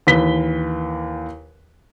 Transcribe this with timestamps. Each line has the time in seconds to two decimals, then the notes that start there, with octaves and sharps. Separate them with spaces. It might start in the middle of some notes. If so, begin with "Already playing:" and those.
0.07 D#2 E3 B4 B6 G7